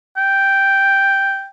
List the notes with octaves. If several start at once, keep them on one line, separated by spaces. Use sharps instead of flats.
G5